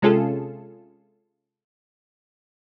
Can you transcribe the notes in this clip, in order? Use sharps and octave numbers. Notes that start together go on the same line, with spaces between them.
C3 G#3 C#4 F4 G#4 A4